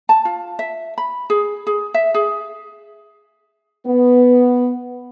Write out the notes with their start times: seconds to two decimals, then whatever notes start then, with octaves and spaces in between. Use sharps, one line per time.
0.09 A5
0.25 F4
0.59 E5
0.98 B5
1.30 G#4
1.67 G#4
1.94 E5
2.14 G#4
3.86 B3